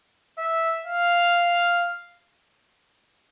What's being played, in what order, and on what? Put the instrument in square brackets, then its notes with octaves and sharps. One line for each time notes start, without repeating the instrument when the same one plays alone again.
[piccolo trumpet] E5
F5